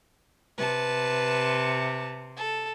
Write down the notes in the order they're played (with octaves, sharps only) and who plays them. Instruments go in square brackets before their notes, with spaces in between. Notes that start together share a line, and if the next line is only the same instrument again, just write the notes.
[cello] C3 [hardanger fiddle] B4 A5
[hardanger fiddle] A4